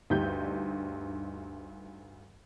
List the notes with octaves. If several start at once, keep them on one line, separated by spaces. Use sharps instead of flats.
D2 G2 D#4 G4 G6